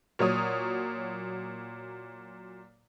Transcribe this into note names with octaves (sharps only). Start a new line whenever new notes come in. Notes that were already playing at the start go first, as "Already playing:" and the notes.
A#2 F#3 C#5 D#6